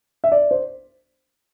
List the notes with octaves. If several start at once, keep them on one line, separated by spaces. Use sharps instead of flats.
E5
D5
C5